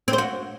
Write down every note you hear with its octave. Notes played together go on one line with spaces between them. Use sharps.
C4
C5
F#4